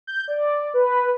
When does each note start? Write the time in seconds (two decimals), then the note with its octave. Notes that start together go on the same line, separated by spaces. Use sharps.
0.07 G6
0.28 D5
0.74 B4